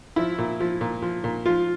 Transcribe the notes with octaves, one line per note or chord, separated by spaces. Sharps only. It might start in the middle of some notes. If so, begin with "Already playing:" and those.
F3 E4
A#2
F3
A#2
F3
A#2
F3 F4